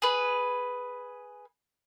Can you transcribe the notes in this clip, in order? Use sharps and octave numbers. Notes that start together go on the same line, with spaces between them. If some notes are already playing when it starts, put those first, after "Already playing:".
G#4 B4